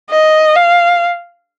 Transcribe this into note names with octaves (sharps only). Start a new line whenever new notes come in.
D#5
F5